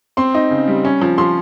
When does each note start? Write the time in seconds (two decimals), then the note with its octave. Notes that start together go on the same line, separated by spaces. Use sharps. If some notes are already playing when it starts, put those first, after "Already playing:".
0.17 C4 C6
0.35 D#4
0.51 C#3
0.68 G3
0.85 C#4
1.01 F3
1.18 F3 C6